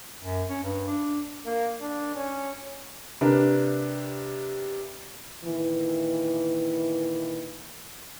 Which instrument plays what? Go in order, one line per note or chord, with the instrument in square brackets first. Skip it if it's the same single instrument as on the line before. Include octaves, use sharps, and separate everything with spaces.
[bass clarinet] F#2
C#4
G2
D4
[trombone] A#3
D4
C#4
[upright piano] C3 D4 A#4 B4
[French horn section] A#2 D#3 E3